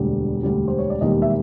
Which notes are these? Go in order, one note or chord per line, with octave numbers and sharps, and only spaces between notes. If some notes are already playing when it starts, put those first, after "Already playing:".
Already playing: E1 D2 D3 G3
E1 D2 D3 G3
C5
C#5
D5
E1 D#2 D#3 G3 D#5
E5